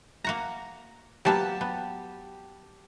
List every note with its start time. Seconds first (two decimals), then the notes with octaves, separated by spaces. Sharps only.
0.24 A#3 F#4 A#5
1.25 F#3 A#3 B3 G4 A5
1.61 B3